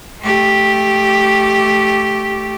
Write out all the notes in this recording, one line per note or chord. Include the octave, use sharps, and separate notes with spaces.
A3 G4